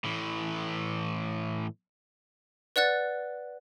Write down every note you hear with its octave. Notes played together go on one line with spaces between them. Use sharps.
A2 E3
B4 D5 F#5 F#6 A6